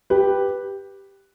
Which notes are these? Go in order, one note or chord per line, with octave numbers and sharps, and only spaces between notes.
G4 B4